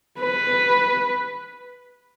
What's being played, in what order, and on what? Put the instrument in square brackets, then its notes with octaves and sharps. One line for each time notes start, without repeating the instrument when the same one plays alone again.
[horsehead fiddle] B4